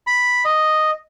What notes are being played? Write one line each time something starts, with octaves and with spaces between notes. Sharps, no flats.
B5
D#5